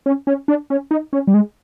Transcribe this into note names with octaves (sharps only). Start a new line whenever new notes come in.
C#4
C#4
D4
C#4
D#4
C#4
G3
G#3